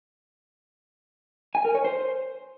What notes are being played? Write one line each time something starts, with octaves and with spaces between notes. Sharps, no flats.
G#5
A#4
C#5
C5